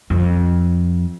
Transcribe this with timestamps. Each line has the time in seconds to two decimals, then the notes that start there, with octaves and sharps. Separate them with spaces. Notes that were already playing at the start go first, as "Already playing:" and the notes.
0.10 F2